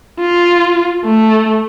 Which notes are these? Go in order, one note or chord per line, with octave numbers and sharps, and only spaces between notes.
F4
A3